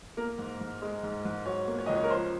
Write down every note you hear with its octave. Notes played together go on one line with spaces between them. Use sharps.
A#3 A#4
G#2
G#2
G#3
G#2
G#2
F#3 C#5
A#3
C#5
C#2 D#5
C#5
A#4
F3 C5